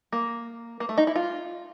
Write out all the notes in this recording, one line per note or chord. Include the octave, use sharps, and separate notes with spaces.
A#3
A#3
A3
D#4
E4
F4